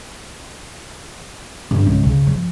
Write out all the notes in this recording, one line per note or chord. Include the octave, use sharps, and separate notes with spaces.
G2 D3
C#2
C#3
F3